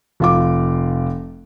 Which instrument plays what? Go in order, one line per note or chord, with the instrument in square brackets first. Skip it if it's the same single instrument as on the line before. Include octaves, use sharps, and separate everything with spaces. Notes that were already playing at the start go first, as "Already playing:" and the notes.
[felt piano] F1 F4 D6